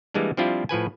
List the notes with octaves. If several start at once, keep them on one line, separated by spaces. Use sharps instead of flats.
E3 G3 G#3 A#3 D4
F3 G3 C4 D4 E4 F4
A2 F3 B4 G#5